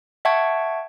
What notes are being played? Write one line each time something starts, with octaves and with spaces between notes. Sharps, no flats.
E5 F#5 G5 A5 C#6 G#6